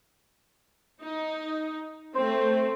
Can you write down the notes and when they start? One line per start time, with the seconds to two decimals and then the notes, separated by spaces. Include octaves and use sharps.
1.02 D#4
2.15 A3 C4 C5